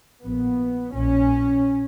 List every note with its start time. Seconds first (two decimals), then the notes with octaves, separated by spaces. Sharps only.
0.24 A#1 A#2 B3
0.95 A#1 A#2 C#4